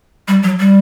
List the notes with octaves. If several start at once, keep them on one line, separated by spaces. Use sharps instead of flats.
G3
F#3
G3